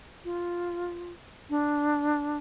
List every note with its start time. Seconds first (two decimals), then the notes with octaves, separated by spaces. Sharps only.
0.25 F4
1.50 D4